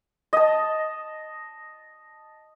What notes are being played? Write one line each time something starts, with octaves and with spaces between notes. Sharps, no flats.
D#5 A5